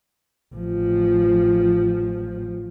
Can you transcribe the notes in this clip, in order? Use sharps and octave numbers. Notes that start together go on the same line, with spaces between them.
A1 F3